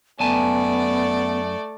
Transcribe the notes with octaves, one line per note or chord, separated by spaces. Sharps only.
F#2 A3 B3 D5 G#5 A5